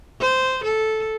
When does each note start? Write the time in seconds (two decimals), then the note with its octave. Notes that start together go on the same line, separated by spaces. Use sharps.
0.20 C5
0.64 A4